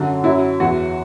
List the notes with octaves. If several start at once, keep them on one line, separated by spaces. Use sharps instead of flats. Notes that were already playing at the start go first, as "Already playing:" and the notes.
Already playing: F#2 D3 F#3
F#2 F#3 E4
E2 E3 F#4